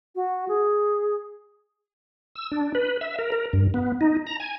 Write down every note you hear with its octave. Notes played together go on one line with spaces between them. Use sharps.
F#4
G#4
E6
D4
B4
E5
A#4
A#4
G2
B3
D#4
A#5
G#5